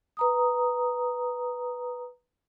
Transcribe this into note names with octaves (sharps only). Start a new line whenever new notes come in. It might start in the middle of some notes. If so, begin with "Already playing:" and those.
B4 A#5 D#6